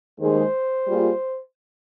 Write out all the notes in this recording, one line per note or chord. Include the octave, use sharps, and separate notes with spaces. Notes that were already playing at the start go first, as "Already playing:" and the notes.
D#2 D#3 G#3 C5
G3 A#3 F4 G#4